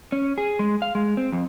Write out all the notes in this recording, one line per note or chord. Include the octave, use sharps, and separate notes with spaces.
C#4
G#4
G#3
F5
G#3
C4
F2